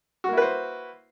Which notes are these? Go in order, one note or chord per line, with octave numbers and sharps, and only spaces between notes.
A#3 E4 F#4 B4 C5